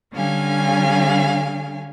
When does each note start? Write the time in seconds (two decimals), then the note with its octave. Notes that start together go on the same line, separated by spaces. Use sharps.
0.13 D3 G3 C#4 F5 G#5